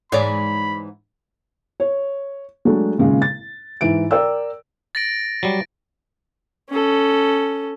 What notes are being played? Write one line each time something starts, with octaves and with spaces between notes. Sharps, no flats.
G#2 E3 G#4 C#5 D5 B5
C#5
F#3 G#3 A3 D4
G#1 A#2 C#3 G#3
A6
G#2 E3 E5 D7
A#4 D5 G5 E6
A6 A#6 D7
F#3 G3
C#4 A4